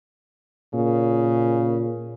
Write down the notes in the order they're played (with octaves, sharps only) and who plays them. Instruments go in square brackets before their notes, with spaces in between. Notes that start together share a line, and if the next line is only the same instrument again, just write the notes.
[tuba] A#2 [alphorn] C#3